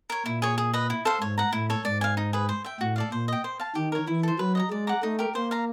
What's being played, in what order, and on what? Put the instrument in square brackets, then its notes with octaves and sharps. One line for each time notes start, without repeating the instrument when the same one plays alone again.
[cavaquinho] A#4 C#5
[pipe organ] A#2 [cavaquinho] E4
[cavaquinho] G#4 C#5
G#4
B4 D#5
E4
A4 C5 F5
[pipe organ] G#2 [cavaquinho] C#5
[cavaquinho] F#5 A#5
[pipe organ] A2 [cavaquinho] E4
[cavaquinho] A4 C#5
[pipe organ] G#2 [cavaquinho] D5
[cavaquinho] F5 G#5
D#4
G#4 B4
C5
E5 G5
[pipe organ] A2 [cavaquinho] F#4
[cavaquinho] A4 D5 F5
[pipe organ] A#2 [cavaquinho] C5
[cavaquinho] D#5 G5
C5
F5 A5
[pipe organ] D#3 [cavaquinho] G4
[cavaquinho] A#4 C#5
[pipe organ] E3 [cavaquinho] E4
[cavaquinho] A4 C5
[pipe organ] F#3 [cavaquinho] B4
[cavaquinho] D#5 F#5 A#5
[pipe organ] G#3 [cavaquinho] D5
[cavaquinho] F#5 A#5 D6
[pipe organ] A3 [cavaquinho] D#4
[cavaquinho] G4 A#4
[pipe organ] A#3 [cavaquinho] C5
[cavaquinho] F5 A#5